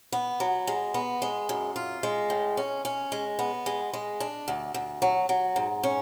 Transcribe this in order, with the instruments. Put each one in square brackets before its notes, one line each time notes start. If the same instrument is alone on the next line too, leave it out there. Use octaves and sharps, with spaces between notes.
[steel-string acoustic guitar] B3
F#3
G#3
B3
G#3
F#2
F4
G#3
A2
C#4
C#4
G#3
B3
G#3
G#3
D4
D2
D2
F#3
F#3
G#2
C#4